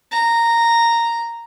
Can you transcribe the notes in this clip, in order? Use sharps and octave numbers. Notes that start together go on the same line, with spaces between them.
A#5